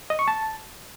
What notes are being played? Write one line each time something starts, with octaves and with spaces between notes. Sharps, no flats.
D#5
C#6
A5